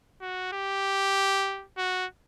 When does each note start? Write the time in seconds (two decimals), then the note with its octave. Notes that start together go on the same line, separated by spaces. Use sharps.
0.21 F#4
0.53 G4
1.78 F#4